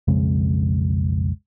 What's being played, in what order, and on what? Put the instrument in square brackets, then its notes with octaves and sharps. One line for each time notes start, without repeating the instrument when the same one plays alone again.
[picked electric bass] B1 F2 C#3 G#3